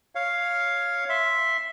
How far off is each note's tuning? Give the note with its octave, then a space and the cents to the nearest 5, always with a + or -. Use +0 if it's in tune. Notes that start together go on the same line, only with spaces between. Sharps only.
C#5 +0 F5 +0
E5 +0 C6 +0